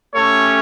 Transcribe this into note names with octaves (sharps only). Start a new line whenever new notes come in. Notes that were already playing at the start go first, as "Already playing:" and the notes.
A3 C#4 G4 A4 C#5